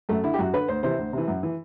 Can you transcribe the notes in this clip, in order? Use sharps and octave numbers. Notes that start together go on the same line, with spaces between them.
F#2 A3
D3 E4
G4
F#2 F#4
D3 B4
D2 C5
C3 E3 C5
D2
C3 E3
F#2
E3